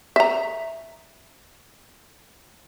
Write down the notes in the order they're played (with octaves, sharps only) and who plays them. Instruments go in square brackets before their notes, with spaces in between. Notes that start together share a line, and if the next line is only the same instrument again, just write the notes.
[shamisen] E5 A#5